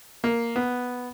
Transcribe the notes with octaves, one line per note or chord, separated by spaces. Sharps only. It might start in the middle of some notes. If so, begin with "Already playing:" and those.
A#3
B3